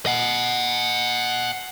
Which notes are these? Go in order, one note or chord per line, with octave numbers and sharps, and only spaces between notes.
D#5 F#5